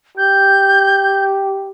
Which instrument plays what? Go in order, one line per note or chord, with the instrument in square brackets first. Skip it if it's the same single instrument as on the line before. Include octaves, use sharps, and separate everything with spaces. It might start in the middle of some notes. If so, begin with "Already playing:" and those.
[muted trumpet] G4 [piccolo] G6